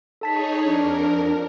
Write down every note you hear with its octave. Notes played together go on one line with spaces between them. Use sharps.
D#4 G#4 A4 C#5 A5 B6
F2 D4 A#4